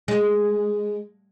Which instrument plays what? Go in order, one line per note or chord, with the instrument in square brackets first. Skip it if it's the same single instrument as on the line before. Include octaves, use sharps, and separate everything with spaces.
[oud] G#3